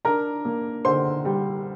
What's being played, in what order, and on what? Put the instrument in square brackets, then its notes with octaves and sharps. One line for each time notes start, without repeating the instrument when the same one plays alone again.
[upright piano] D4 A#4 A#5
A#3
D3 C5 C6
G3